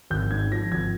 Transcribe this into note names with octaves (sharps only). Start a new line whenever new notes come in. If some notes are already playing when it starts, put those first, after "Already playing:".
G#1 G6
G#2 G#6
F3 A#6
G#1 G#6